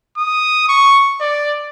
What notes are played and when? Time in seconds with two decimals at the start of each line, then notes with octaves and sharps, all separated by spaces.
0.18 D#6
0.69 C#6
1.21 D5